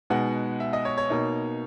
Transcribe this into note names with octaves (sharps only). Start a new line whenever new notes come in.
B2 G#3 B3 D#4 F#5
E5
D#5
C#5
C#5
B2 A#3 D#4